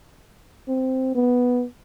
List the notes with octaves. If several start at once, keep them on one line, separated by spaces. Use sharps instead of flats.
C4
B3